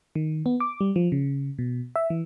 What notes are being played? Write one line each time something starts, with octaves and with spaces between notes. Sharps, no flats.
D#3
B3
D6
G3
F3
C#3
B2
E5
E3